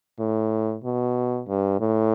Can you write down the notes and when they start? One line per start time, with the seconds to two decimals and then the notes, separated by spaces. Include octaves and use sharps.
0.19 A2
0.84 B2
1.48 G2
1.80 A2